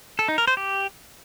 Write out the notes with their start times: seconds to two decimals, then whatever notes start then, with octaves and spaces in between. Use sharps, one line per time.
0.19 A4
0.28 D#4
0.38 A#4
0.47 C5
0.57 G4